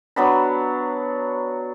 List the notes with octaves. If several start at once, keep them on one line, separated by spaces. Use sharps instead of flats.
F#3 B3 D4 B5